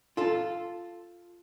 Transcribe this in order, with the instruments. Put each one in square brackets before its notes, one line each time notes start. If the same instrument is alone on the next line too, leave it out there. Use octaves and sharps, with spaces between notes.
[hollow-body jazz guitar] F4 A4